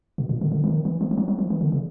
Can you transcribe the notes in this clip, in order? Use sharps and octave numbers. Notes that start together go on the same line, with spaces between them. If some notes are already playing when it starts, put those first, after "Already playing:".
B2
A#2
D3
D3
E3
D#3
E3
F3
F3
F#3
F#3
F3
E3
D3
C#3